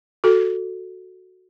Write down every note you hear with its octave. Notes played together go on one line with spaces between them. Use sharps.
F#4 A4